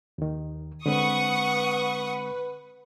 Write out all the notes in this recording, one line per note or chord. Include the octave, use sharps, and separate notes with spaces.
D#2 D#3
D3 G#3 C4 B4 F#5 C#6 D#6